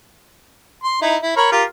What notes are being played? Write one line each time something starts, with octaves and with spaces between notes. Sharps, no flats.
C6
D#4 E4
E4
A#4 C#5 B5
F4 G4 A#4